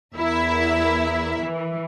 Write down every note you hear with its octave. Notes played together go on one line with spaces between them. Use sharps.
E2 E4 A#4 E5
E3